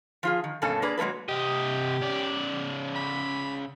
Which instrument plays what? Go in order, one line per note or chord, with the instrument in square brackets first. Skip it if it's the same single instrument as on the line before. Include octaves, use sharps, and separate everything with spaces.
[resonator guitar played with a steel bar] F3 F4 G#4
D#3
G2 B2 A#3 C#4 A4 G#5
A#3 D4 G#4 B4 D5
F#3 G#3 A#3 A4 B4
[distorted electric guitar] C3 D#5 [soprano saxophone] G4
[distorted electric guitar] C#3 D5
[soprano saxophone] B5